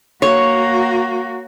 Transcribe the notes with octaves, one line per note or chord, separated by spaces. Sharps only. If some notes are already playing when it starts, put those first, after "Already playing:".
A#3 F#4 C#5